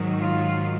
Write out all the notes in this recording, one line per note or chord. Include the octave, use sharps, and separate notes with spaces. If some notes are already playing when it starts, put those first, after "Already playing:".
Already playing: G#2 D#3 F#3
F4